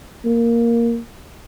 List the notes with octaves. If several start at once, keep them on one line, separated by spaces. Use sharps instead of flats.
A#3